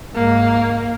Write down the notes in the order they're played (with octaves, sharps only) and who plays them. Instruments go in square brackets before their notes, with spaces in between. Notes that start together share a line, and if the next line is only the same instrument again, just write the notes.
[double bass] G#2 [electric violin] A#3